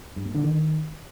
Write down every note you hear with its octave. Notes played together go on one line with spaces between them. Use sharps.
G2
A#2
D3
D#3